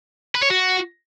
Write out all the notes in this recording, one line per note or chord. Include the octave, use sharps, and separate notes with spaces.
B4
C#5
F#4